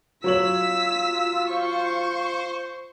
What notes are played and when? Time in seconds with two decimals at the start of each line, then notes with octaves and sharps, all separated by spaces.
0.24 F#3 F4 C#5 E6 B6 F#7
1.49 C5 C#6